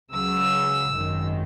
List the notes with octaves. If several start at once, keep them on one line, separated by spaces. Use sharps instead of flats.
C#2 C#3 F#3 E6
G#1 F#2 D#3